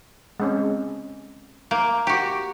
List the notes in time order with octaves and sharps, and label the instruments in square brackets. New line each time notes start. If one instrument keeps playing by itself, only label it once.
[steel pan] G#3 C4 C#4
[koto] A#3
F#4 G4